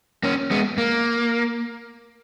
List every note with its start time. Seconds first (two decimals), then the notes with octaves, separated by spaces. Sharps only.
0.23 A#3 C#4
0.51 G#3 B3
0.78 A#3